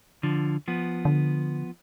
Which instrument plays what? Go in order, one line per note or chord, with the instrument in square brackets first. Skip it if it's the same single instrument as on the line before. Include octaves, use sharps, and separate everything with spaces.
[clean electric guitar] D3 F3
F3 B3
[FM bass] D3